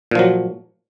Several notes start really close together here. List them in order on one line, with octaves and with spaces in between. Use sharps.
A#2 F3 F#3